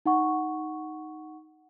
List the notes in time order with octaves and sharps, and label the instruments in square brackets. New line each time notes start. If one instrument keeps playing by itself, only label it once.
[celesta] D#4 F#5 C#6